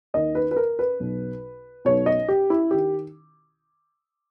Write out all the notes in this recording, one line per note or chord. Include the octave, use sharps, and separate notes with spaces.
D#2 D#3 D#5
B4
B4
A#4
B4
B1 B2
B1 B2 C#5
D#5
G4
E4
D#3 G4